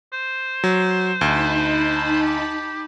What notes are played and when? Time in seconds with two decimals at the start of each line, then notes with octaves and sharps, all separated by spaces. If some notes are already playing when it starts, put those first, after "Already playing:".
0.13 C5
0.64 F#3
1.21 D2 D#4 A5 B5
2.23 G4